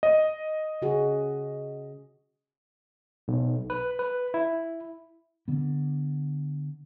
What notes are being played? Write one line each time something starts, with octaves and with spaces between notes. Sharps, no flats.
D#5
C#3 F#4 G#4
B1
B4
B4
E4
D3 B3